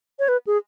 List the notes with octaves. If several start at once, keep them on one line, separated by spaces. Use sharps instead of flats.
C#5
B4
G#4